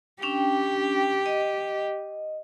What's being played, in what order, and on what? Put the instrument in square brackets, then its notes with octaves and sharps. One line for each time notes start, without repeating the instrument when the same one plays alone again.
[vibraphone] C#4 D4 G5 [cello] G4
[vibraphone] D#5